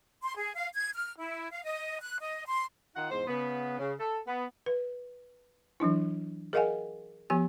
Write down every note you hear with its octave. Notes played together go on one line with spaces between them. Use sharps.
C6
G#4
F5
G#6
F6
E4
F5
D#5
F#6
D#5
C6
D#3 D#4 F4 F#5
E2 G#2 C5
C#3 B3
C#3
A4
B3
B4
E3 F#3 D4 E4
G#4 A#4 D#5 F5 F#5 G#5
F3 B3 G4 G#5